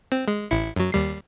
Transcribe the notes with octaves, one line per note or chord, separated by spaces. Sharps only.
C4
G#3
A1 E4 C#7
F#2 F#3
D#2 G3 C7